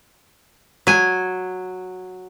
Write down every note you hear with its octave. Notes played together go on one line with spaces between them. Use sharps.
F#3 G#5